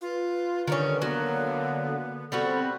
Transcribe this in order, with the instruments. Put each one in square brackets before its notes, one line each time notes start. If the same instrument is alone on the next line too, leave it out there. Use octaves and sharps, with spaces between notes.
[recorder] F4 [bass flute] B4
[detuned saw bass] D3 [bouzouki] D#3 G3 C#4
[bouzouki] F#3 [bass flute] A#3 [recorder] B3
[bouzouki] G3 B3 F#4 [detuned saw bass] C4 [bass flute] A4